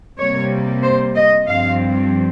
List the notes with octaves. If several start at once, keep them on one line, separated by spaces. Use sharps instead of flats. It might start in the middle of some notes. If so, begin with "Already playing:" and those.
C3 G3 A#3 C#5
C5
D#5
G2 F3 C4 F5